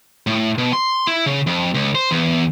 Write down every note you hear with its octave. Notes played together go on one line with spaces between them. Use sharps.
A2
B2
C6
E4
C#3
F2
C#2
C5
E2